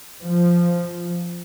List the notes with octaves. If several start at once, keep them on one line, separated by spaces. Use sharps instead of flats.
F3